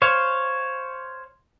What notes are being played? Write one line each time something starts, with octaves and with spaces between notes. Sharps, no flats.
C5 C#5 F5